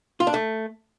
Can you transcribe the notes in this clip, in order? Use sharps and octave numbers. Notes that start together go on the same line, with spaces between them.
F4
D4
A3